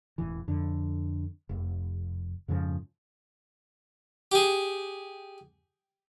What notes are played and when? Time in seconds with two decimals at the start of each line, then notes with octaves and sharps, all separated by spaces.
0.18 E1 A1 E3
0.48 F2 D3
1.49 F1
2.48 F2 G#2 C#3 F3
4.32 G4 G#4